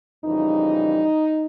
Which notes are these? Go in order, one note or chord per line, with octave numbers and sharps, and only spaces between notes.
F2 C#3 E3 G3 D#4